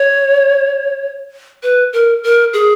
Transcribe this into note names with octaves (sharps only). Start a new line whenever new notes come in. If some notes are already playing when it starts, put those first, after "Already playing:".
Already playing: C#5
B4
A#4
A#4
G#4